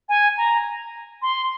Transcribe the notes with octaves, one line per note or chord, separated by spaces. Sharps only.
G#5
A#5
C6